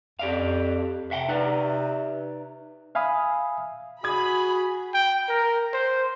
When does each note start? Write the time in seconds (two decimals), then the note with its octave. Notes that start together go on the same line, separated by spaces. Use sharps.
0.19 F2 G4 D5 F5
1.11 C3 E5 F#5 G5
1.29 D#4 B4 D5
2.95 E5 F5 G#5 B5 D#6
4.04 F#4 G#4 B5 D#6 G#6
4.94 G5
5.29 A#4
5.73 C5